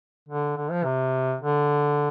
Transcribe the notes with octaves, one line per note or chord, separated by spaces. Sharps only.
D3
D3
F3
C3
D3